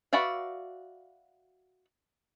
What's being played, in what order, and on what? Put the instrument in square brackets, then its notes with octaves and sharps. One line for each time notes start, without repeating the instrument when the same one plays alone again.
[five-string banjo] F#4 B4 D5 E5 F5